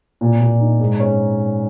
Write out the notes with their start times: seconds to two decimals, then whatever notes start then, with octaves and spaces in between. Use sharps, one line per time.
0.21 A#2
0.41 A#2
0.60 D#4
0.80 G#2
1.00 C#4